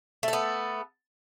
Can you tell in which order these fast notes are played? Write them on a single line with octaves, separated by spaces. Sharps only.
A3 A4 B3